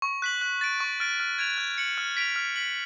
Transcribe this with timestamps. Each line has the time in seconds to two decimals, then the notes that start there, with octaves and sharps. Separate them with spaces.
0.02 C#6
0.22 F#6 B6 F#7
0.41 F#6
0.61 A6 D7
0.80 C#6
1.00 F6 A6 D7
1.20 F6
1.39 G#6 D7 F7
1.58 F#6
1.78 C#7 F#7
1.98 F6
2.17 B6 D7 F7
2.36 F6
2.56 B6 F#7